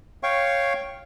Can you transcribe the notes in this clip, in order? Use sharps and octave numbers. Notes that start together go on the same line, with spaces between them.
C#5 F5 G5 C#6